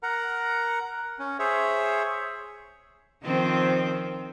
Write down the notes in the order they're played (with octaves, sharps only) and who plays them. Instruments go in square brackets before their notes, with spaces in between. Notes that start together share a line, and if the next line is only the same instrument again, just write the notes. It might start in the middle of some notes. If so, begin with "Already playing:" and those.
[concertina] A#4 F#5 A#5
C#4
G#4 C5 C#5 E5
[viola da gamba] D#3 F3 C4